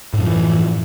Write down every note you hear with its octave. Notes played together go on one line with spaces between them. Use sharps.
F#2 A2 E3 F3